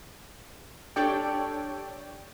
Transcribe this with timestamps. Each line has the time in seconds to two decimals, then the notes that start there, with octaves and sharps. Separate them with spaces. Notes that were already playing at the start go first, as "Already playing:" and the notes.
0.96 D4 G4 A4 C#5 D5 G5